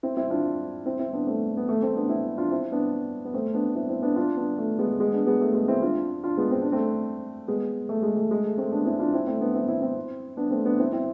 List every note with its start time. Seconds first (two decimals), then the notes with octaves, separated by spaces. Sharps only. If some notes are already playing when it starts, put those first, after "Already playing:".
0.03 C4 E4
0.17 C4 E4
0.30 D4 F4
0.85 C4 E4
0.99 C4 E4
1.13 B3 D4
1.27 A3 C4
1.57 B3
1.69 A3
1.82 A3 C4
1.96 B3 D4
2.09 C4 E4
2.37 D4 F4
2.51 C4 E4
2.72 B3 D4
3.25 B3
3.34 A3 C4
3.54 B3 D4
3.75 C4 E4
3.89 C4 E4
4.02 B3 D4
4.16 D4 F4
4.37 B3 D4
4.58 A3
4.79 G#3 B3
4.99 G#3 B3
5.13 B3 D4
5.27 G#3 B3
5.41 A3
5.54 G#3 B3
5.68 C4 E4
5.82 D4 F4
6.24 D4 F4
6.37 G#3 B3
6.51 C4
6.62 D4
6.72 A3 C4
7.48 G#3 B3
7.89 A3
8.03 G#3
8.17 A3
8.31 G#3
8.44 A3
8.58 A3 C4
8.72 B3 D4
8.86 C4 E4
8.99 D4 F4
9.13 C4 E4
9.27 A3 C4
9.40 B3 D4
9.55 C4 E4
9.68 C4 E4
9.82 C4 E4
10.37 B3 D4
10.51 A3 C4
10.65 B3 D4
10.79 C4 E4
10.93 C4 E4